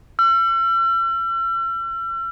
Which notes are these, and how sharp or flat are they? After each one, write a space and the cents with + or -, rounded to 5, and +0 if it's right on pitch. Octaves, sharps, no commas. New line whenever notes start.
E6 +45